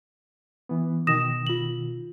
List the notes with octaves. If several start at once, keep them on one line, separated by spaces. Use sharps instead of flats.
E3 B3
B2 D#3 D#6 A#6 E7
F4 F#7